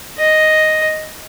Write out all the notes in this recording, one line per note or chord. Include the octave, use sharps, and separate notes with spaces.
D#5